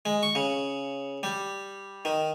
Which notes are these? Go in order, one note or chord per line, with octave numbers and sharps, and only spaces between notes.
G#3
C#6
C#3
G3
D#3